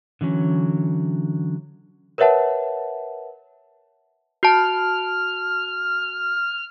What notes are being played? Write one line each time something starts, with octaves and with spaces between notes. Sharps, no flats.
D3 E3 F#3 C#4
A#4 B4 C#5 E5 F#5 A5
F#4 A5 F6